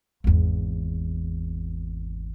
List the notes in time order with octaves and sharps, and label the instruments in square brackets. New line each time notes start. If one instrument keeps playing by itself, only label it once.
[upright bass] G#1 E2